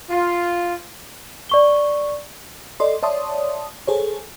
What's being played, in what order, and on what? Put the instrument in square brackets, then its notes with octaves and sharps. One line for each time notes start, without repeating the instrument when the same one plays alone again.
[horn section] F4
[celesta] D5 C#6 G7
[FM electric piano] A4 D5 D#5 C6
C#5 D5 E5 A5 C6 D#6
G#4 A4 C5 C#5